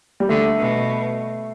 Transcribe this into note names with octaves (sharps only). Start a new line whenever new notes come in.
G3
D3 A3
B2